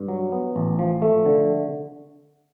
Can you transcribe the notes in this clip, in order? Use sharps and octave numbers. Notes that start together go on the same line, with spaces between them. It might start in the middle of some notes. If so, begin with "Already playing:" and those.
Already playing: G2
F#3
B3
A1
F3
A3
D3